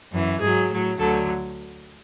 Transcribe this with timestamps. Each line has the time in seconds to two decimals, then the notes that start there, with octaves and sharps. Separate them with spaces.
0.12 F#2 E3
0.41 G#2 F#3 G#4
0.70 A2 F#3
0.98 D2 D3 F#3 A4